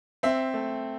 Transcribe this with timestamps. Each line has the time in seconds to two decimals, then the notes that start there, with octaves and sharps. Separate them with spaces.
0.23 C4 E5
0.54 A3